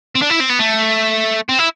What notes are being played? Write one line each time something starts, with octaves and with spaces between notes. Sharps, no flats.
C4
D4
E4
C4
B3
A3
C4
E4